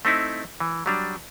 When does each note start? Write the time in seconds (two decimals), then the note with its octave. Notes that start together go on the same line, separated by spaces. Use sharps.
0.05 A3 C4 D#4 E4
0.60 E3
0.86 F#3 G3 D4